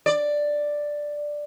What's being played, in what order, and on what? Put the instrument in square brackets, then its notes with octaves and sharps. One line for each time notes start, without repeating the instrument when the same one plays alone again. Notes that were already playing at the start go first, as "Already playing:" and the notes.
[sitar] D5